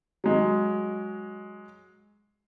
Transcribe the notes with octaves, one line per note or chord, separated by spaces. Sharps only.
F#3 G#3